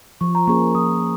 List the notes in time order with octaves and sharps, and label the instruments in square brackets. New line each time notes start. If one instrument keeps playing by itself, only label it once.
[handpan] F3 [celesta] C#6
[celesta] A#5
[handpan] A#3 C#4 G#4 [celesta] C#6
[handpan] F3 [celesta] D#6